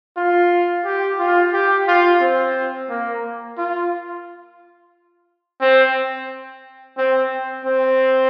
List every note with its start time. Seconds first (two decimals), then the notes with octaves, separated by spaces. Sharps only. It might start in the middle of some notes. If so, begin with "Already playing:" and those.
0.17 F4
0.85 G4
1.19 F4
1.53 G4
1.88 F4
2.21 C4
2.89 A#3
3.58 F4
5.61 C4
6.98 C4
7.66 C4